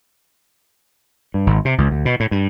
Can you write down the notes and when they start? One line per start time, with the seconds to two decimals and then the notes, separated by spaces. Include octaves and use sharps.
1.34 G2
1.47 G#1
1.65 C3
1.78 C#2
1.91 D2
2.05 B2
2.20 A2
2.31 G2